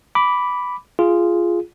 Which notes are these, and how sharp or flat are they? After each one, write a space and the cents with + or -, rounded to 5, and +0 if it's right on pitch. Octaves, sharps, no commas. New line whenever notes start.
B5 +0 D6 -10
F4 -10 G#4 +0